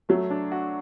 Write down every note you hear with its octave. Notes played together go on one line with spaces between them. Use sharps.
F#3 A3
D4
F#4